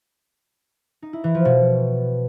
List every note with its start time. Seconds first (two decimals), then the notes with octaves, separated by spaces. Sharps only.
1.02 D#4
1.13 E4
1.24 E3
1.35 F3
1.45 B2